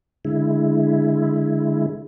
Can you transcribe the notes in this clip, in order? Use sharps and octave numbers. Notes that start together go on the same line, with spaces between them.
D3 G#3 E4